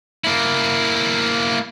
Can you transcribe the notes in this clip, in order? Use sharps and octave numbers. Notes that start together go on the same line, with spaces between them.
A#3 E4